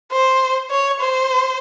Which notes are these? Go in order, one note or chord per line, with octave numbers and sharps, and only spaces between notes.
C5
C#5
C5